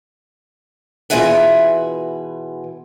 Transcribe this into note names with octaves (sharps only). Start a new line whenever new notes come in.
B2 E3 F4 G#4 E5 F#5